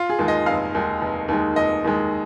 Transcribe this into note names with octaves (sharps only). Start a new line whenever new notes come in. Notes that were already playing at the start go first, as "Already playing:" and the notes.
Already playing: F4
G#4
D#2 D#3 G#3
D#5
F1 F5
D#2 D#3 G#3
F1
D#2 D#3 G#3
F1 D#5
D#2 D#3 G#3